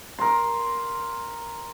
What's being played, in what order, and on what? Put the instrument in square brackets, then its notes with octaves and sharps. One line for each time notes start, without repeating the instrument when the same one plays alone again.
[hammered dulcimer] A#4 C6